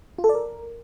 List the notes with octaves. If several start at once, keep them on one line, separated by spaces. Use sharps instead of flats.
F4
A4
D5
A#4